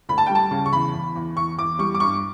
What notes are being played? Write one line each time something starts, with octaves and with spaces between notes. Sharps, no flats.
D2 B5
A5
G3 G5
A5
C#3
C#6
E2 B5
E2
E2
E2 C#6
E2 D6
G3 C#6
D6
G2 C#6